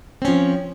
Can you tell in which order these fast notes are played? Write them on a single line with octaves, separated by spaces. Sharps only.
C4 C#4 F3